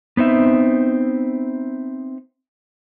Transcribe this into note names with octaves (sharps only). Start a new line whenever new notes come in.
B3 C4 D#4 E5